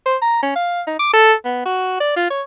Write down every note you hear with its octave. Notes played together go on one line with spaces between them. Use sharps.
C5
A#5
C#4
F5
D#4
D6
A4
B3
F#4
D5
F4
C#5